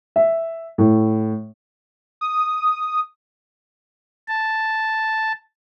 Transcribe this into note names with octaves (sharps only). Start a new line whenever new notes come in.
E5
A2
D#6
A5